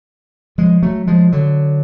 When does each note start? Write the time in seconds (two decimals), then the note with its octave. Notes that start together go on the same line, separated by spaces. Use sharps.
0.58 F3 G#3
0.83 F#3 A3
1.07 F3 G#3
1.32 D3 F#3